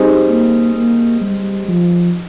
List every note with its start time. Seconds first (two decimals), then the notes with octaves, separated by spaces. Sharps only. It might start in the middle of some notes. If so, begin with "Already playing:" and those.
Already playing: G3 C4 D#4 G#4
0.29 A#3
0.75 A#3
1.21 G3
1.68 F3